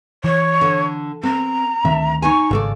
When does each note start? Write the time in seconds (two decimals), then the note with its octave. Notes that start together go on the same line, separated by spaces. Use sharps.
0.24 E3 C#5
0.61 D3
1.23 C4 A#5
1.85 D2 D#3 C4 E5
2.22 D#4 C#5 G#5 C#6
2.51 G#1 C#3 A4 D5